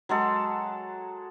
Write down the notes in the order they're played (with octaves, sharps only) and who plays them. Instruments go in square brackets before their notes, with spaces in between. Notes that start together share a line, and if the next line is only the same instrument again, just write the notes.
[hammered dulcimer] F#3 G#3 A4